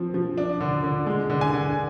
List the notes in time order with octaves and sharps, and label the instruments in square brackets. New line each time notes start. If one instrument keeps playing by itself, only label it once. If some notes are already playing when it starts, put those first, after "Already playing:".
Already playing: [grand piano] F3 C4
F3
D4
D3
D3
G#3
D3
G#5
D3